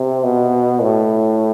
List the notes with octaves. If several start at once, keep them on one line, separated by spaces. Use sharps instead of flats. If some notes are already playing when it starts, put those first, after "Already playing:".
Already playing: C3
B2
A2